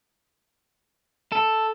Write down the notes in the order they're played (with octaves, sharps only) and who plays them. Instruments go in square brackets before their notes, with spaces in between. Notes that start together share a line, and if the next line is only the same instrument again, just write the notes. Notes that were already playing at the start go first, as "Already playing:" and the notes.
[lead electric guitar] A4